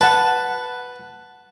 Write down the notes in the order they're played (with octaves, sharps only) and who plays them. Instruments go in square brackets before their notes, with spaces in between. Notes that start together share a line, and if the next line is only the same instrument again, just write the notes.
[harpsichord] B4 [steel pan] F#5 A5